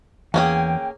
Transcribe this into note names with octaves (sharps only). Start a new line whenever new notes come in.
E2 A#3 C#4 G#4 G5